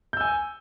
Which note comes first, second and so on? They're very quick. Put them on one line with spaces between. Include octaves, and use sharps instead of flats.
G6 E6 G#5